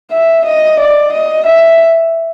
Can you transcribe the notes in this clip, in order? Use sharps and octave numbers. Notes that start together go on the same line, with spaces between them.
E5
D#5
D5
D#5
E5